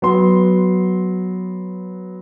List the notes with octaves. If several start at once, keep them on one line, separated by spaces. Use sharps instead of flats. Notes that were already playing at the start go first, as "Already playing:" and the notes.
F#3 B3 C6